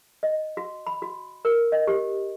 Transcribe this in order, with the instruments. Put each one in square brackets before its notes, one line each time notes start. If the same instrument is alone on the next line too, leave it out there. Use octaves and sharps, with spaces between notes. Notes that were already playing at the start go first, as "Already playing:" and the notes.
[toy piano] D#5
F#4
B5
F#4
A#4
D#5
G4